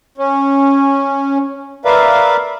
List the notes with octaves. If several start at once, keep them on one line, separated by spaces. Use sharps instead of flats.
C#4
A#4 B4 D5 E5 F5